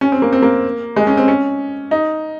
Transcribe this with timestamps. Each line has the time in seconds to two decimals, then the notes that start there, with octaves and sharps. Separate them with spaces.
0.01 C#4
0.12 C4
0.22 A#3
0.33 C4
0.42 A#3
0.96 G#3
1.07 C#4
1.17 C4
1.28 C#4
1.91 D#4